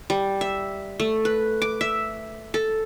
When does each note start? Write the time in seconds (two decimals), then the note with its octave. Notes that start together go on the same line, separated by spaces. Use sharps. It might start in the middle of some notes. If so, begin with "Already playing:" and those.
0.10 G3
0.41 E5
1.00 A3
1.25 B4
1.62 D6
1.81 E5
2.54 A4